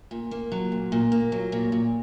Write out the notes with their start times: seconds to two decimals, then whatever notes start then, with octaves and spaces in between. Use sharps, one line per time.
0.11 A#2
0.31 A#3
0.52 F#3
0.72 A#2
0.92 A#2
1.12 A#3
1.32 F#3
1.52 A#2
1.72 A#2